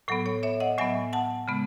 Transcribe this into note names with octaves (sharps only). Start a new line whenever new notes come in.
A2 F#3 B3 A4
A4 C#5
C#5 E5
D#5 F#5
A2 F#3 B3 E5 G#5
F#5 A5
C#3 G#3 B3